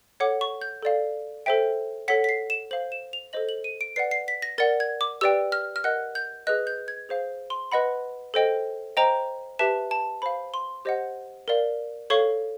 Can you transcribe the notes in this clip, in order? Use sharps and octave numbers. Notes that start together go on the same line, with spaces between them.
A4 C#5 F#5 D6
C#6
G6
A4 D5 F5
A4 C5 E5 G5
A4 C#5 F#5 B6
B6
C7
E7
C5 F5 F#7
E7
F7
A4 C5 D#5 F#7
F#7
D#7
D7
B4 D5 F#5 C7
C7
B6
A#6
A#4 D5 F#5 A6
G#6
D6
G4 B4 D5 G5 E6
F6
F6
A#4 D#5 F#5 F#6
G6
G#4 B4 D#5 F#6
G6
G#6
G#4 C5 F5
C6
B4 D#5 F#5 B5
A4 C5 D#5 G5
C5 D#5 G5 A#5
G4 B4 E5 A5
A5
C5 F5 B5
C6
G4 C5 D#5 F#5
A#4 D5 F5
A4 C#5 F5 C#6